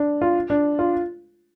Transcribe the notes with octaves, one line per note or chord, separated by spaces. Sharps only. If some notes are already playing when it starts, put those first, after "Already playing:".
Already playing: D4
F4
D4
F4